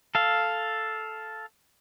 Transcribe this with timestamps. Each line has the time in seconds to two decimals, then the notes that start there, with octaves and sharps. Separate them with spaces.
0.15 A4 F5